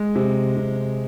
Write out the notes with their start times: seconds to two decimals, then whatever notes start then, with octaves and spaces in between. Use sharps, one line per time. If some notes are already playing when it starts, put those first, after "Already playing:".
Already playing: G#3
0.15 C3
0.57 C3